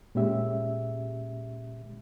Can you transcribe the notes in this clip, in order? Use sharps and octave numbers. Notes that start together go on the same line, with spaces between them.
A#2 G#3 C#4 G4 E5